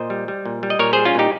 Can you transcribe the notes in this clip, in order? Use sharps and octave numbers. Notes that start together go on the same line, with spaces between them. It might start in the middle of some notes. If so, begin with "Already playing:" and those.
Already playing: A#2 C5 D#5
G3
G3
A#2
G3
D#5
A#2 A#4 C#5
G3 G#4 C5
C#4 F4
A#2 D#4 G4